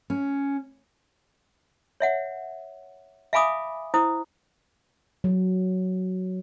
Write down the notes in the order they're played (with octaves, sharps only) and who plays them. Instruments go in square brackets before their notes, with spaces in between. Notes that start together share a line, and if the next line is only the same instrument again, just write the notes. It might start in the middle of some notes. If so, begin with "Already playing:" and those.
[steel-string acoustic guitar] C#4
[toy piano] C#5 E5 F#5
E5 F5 G#5 B5 D6 D#6
E4 C5 D#6
[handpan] F#3